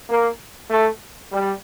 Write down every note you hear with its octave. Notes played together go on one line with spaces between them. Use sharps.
A#3
A3
G3